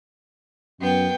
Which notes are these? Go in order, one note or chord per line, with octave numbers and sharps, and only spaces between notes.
F#2 B3 G5